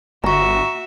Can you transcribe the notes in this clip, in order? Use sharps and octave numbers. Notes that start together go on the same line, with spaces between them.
G1 F#4 E5 A#5 C#6